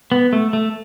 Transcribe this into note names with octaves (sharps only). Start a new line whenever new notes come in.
B3
A3
A3